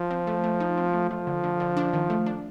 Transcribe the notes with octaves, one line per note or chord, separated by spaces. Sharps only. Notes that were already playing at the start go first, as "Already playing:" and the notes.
Already playing: F3
C4
A3
A3
D#4
C4
A3
F3 A3
D3
D3
D3
D4
D#3
A3
D4